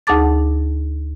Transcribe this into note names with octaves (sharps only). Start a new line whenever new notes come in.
D2 D#4 G#4 A5 D6 A6